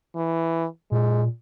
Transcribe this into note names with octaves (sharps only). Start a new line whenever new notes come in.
E3
A#2 G#3